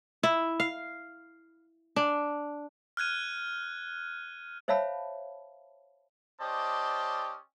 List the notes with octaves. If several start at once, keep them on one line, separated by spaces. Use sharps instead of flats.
E4
F5
D4
F6 F#6 G#6 D#7
C5 C#5 E5 F5 A5 B5
C#4 G4 C5 D5 D#5 A5